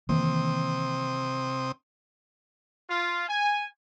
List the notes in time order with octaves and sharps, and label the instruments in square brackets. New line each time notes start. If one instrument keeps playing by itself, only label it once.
[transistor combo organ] C3 C4 D#6 [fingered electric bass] D#3 E3 A#3
[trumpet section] F4
G#5